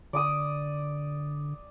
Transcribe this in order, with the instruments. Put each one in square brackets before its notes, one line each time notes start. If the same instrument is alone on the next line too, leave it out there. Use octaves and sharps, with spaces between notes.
[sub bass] D3 [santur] D5 D6 D#6